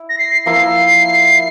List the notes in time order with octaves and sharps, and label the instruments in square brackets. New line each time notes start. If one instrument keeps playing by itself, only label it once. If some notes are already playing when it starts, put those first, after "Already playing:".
Already playing: [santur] E4
[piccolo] A#6
C7
[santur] F3 A#3 E4 [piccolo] C7